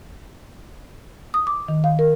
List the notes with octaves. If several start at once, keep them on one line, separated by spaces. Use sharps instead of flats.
D#6
D6
D#3
F5
A#4